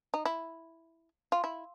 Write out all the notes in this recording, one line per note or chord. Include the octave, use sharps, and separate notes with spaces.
D#4
E4
F4
E4